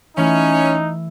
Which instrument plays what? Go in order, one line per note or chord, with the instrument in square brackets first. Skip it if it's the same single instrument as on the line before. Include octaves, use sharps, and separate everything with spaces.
[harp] E3 A3 E4 [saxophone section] C#4 [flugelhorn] D#4
[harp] E6